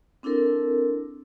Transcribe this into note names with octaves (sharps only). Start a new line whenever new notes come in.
C4 D4 E4 A4 A#4